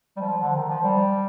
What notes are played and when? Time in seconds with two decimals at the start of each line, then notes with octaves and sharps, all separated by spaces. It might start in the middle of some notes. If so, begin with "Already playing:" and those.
0.17 G3
0.21 F3
0.41 D3
0.55 D#3
0.69 F3
0.83 G3